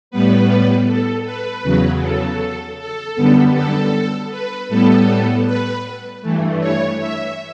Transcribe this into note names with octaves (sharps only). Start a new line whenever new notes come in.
A2 G3 B3 B4
A4
B4
E2 C#3 F#3
A4
A4
F#2 D3 G3 B3
A4
B4
A2 G3 B3 A4
B4
G2 E3 A3
C#5
E5